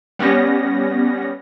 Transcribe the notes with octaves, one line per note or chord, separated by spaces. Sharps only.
G3 B3 C#4 A#6